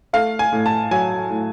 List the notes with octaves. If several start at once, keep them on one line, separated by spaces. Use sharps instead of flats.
A3 F5
G#5
A2
A5
F#3 G#5
A2